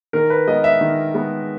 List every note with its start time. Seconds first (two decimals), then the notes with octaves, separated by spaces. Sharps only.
0.13 D#3 A#4
0.30 B4
0.47 G#3 B3 D#5
0.64 E5
0.81 D#3
1.14 G#3 B3